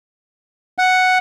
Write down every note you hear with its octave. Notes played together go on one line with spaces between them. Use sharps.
F#5